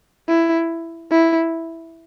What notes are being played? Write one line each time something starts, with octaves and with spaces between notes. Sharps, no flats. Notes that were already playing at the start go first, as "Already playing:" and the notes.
E4
E4